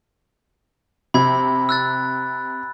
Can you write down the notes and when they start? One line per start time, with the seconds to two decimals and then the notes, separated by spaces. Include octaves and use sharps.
1.14 C3 B5 G#6
1.69 E6 F#6 A6